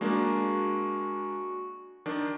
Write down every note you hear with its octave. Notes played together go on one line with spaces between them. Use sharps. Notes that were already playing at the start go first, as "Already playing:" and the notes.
G#3 A#3 D4 F#4
D#3 D4